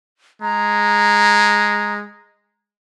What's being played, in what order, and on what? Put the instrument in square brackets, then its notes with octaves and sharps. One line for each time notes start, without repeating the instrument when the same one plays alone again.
[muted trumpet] G#3 [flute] A#5